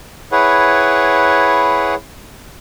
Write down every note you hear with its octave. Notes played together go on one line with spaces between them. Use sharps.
E4 G#4 B4 C#5 F#5